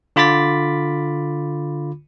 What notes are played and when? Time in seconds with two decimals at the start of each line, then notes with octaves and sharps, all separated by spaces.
0.16 D3 F4 B5 D6 A6 B6